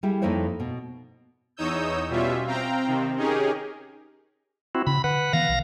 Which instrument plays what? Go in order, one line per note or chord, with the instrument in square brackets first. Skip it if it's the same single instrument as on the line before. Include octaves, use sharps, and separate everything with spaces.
[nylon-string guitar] G3 E4 G4 G#4
F2 A#3 D#4 E4 C5 C#5
B2
[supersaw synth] E2 D#4 C#5 D#6 E6 G6
B2 G3 C#4 F4 E5
C4 F5 G5 A#5
C3 D#3 C4
C#4 D#4 G4 G#4 A#4
[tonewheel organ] C4 E4 F#4
[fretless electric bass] C#3 [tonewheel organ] B5
[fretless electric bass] D3 [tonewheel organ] B4 F#5
[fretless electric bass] D#3 E3 B3 [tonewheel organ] F5 A#6
[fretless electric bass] B1